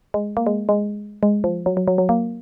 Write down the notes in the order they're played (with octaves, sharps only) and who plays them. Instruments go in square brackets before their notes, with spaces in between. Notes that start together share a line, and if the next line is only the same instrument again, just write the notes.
[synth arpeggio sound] G#3
A#3
G#3
G#3
G#3
F3
F#3
F#3
F#3
F#3
A#3